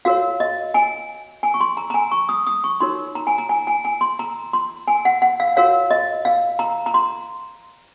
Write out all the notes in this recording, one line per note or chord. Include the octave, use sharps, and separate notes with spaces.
F#4 A#4 C#5 F5
D#5
G#5
G#5
C#6
C6
A#5
A#5
G#5
C#6
D#6
D#6
C#6
D#4 F#4 A#4 C#5 C6
A#5
G#5
A#5
G#5
G#5
G#5
C6
A#5
C6
G#5
F#5
F#5
F5
F#4 A#4 C#5 F5
D#5
F5
A#5
A#5
C6